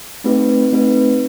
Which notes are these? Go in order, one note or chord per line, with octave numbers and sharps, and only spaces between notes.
A3 C4 D#4 G4 B4
A3 C4 D#4 G4 B4